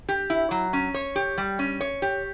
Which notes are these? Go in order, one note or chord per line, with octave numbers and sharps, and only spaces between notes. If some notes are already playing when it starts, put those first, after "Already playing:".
G4
E4
F#3
C#4
C#5
G4
G3
C#4
C#5
G4